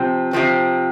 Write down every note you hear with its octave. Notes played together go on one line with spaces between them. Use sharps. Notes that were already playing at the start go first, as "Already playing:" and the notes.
Already playing: C3 F3 C4
C3 F3 C4